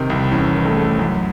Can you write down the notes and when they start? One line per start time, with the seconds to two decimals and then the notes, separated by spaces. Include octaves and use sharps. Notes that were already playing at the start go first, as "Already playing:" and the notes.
Already playing: C3 D#3
0.10 C2
0.31 E2 C#4
0.55 D#3
0.65 A3 A4
0.77 A3
0.99 F#2